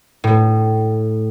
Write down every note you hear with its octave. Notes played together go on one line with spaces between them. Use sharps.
A2